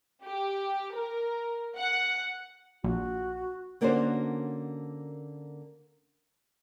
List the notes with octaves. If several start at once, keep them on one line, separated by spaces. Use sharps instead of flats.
G4
A#4
F#5
A#1 F#4
D3 A#3 C#4 D4 F#4 C5